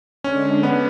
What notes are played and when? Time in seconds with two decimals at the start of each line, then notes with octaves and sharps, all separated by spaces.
0.24 D3 G#3 C#4 D4
0.63 B3